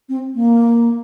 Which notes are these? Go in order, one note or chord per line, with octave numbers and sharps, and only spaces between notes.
C4
A#3